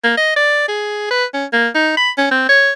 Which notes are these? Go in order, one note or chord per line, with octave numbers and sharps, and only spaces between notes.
A#3
D#5
D5
G#4
B4
C#4
A#3
D#4
B5
C#4
C4
C#5